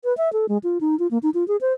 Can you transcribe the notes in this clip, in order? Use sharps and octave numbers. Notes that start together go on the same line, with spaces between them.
B4
E5
A4
G#3
F4
D#4
F4
A#3
D#4
F4
G#4
C5